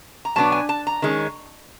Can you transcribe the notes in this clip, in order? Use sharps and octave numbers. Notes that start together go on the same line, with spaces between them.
A#5
B2 F#3 B3 D4 A5
G#5
A5
A#5
D#3 G#3 C#4